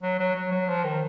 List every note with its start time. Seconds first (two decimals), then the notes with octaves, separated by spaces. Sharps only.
0.03 F#3
0.19 F#3
0.35 F#3
0.51 F#3
0.68 F3
0.84 D#3